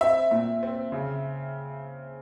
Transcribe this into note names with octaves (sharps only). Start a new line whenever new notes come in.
C4 E5
A#2
C4
C#3